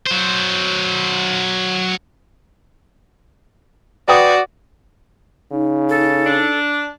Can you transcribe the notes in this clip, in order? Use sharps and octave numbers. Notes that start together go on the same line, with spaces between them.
F#3 C5
F#4 B4 D5 G5 D#6
C#3 D#4
A4
D4